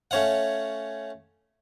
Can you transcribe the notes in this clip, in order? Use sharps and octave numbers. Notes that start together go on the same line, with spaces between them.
A3 C#4 C#5 F5 F#5